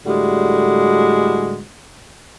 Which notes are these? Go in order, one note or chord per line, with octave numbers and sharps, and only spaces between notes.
A2 D3 G3 G#3 F#4